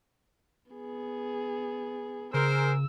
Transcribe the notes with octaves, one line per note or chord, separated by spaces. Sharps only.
B3 G#4
C#3 G#4 A#4 C5 E6